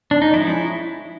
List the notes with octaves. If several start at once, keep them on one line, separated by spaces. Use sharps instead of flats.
D4
D#4
F3 G#3 C#4 E4